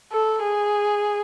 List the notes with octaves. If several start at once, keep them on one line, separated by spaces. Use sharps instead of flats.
A4
G#4